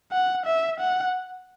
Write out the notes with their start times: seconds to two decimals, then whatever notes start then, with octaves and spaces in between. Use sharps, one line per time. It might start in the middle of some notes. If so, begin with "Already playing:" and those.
0.11 F#5
0.46 E5
0.80 F#5